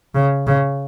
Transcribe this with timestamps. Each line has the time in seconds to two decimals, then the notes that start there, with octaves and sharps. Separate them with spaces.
0.15 C#3
0.47 C#3